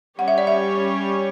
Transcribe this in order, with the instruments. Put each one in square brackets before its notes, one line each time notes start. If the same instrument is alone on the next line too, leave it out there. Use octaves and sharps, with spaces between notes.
[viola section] G3 C#4 G4 C#5 [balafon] F#5
[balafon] E5
D5
E5